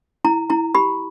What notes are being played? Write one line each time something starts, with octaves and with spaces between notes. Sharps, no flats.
E4 A#5
E4 A#5
G4 B5